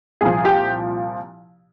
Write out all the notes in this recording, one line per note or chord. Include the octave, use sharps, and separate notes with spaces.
C2 A#2 F3 G#4
G4